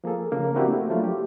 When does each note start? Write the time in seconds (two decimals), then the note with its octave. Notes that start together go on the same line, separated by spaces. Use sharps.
0.04 F3 A#3 G#4 A4
0.32 C#3 A#3
0.55 A#3 C4 D4 E4 F#4 G4
0.68 A3
0.89 F3 F#3 A3 A#3 D4 F4
1.04 G4